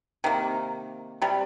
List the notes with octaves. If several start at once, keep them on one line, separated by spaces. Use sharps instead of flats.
C3 D#3 A#3
C3 G3